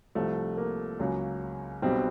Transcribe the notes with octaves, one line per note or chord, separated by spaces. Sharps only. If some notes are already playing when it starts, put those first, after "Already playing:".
C2 C3 F3 A3
A#3
C#2 C#3 F#3
B1 B2 G3 C4